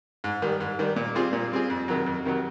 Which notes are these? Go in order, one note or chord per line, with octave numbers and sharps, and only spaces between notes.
G#2
D#3 G3
G#2
D#3 G3
A#2
G3 C4 F4 G#4
A#2
G3 C4 F4 G#4
F2
C3 D#3 F#3
F2
C3 D#3 F#3